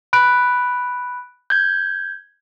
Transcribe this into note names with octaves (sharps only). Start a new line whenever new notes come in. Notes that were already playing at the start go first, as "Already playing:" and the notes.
B5 F#6 D7
G6 G#6